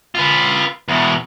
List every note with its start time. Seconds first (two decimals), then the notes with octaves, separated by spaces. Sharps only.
0.15 F4 B4
0.88 E2 B2